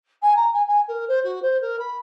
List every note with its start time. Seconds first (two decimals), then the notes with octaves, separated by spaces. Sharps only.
0.22 G#5
0.36 A#5
0.53 G#5
0.67 G#5
0.88 A#4
1.08 C5
1.24 F#4
1.42 C5
1.61 A#4
1.79 B5